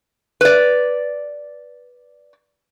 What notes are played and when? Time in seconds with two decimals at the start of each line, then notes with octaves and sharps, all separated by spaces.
0.41 B4 D5